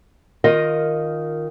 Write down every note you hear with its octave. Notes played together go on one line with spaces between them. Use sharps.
D#3 F4 A#4 D#5